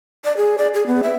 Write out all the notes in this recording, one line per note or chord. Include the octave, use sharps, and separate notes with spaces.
D5
G#4
D5
G#4
B3
E5